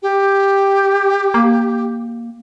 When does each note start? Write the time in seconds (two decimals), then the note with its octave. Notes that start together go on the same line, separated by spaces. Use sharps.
0.02 G4
1.34 A#3